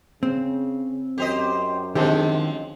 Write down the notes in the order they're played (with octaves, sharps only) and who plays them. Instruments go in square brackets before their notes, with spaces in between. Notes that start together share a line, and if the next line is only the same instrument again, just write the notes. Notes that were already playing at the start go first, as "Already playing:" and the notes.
[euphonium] C#3 [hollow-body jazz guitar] C4
[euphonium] F#2 [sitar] G4 C5 D#5
[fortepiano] D3 C4 G4 [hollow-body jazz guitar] D#3 [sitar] F3 G#3